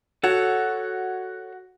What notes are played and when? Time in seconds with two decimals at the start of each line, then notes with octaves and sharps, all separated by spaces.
0.23 F#4 A4 C#5 F#5